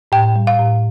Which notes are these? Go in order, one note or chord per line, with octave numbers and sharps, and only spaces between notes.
A2 G5
G3
F5
A2